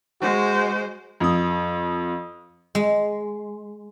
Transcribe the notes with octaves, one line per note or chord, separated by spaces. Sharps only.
G#3 F#4 C5
F2 D#6
G#3